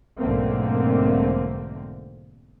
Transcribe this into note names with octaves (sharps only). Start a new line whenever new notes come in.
B1 G#2 D3 A3 A#3 C4